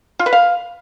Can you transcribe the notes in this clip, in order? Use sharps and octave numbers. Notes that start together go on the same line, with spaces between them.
F4
B4
F5